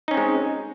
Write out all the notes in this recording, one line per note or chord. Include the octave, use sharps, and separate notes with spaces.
G#3 C4 C#4 D#4